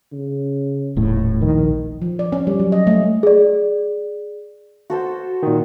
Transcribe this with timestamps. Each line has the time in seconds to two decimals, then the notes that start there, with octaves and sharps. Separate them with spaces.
0.12 C#3
0.97 D#1 A2
1.41 A#1 D#3
2.02 F3
2.19 D5
2.32 C#4
2.47 G3
2.60 F#3
2.72 D#5
2.87 A3
3.23 G#4 D5
4.90 F#4 A4 C5
5.43 A#2 D#3